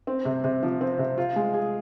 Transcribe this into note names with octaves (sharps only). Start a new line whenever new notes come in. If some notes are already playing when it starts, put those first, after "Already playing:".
C4
C3
C3
F3
C4
C3
F4
G#3
G#4